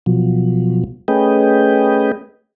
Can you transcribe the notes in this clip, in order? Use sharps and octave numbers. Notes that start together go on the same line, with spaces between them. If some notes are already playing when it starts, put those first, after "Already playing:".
B2 F3 F#3
A3 C#4 G#4 B4 D#5 G5